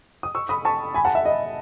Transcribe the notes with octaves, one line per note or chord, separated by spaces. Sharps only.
D#6
C#6 E6
B5 D#6
A5 C#6
G#5 B5
F#5 A5
E5
D#5